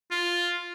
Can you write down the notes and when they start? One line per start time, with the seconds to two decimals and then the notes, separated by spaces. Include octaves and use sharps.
0.11 F4